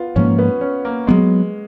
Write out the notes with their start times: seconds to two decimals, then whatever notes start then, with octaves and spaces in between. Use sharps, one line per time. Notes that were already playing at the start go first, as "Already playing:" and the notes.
Already playing: B3 F4
0.16 G#2 F3 A#3 C#4
0.38 B3
0.61 C#4
0.85 A#3
1.07 F#3 G#3 B3